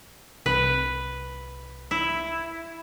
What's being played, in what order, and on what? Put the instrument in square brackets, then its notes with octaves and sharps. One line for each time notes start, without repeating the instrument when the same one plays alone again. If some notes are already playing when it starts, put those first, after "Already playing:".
[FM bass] C2 [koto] B4
[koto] E4